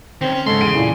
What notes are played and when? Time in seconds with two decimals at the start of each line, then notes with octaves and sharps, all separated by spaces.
0.21 D#3 C4 C#4
0.33 C#4
0.46 G#2 C#3 A4 C6
0.60 E2 D7 D#7
0.75 A#2 E3